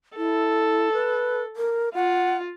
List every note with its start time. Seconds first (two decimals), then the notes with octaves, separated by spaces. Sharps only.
0.17 E4 A4
0.93 B4
1.56 A#4
1.95 F4 F#5